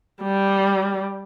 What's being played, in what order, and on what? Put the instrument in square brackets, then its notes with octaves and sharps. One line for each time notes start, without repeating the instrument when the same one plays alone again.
[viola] G3